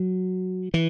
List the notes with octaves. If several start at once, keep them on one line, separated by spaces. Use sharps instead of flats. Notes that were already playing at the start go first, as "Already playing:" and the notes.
Already playing: F#3
E3